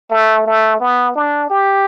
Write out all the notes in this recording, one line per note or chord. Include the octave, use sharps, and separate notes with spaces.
A3
A3
B3
D4
G4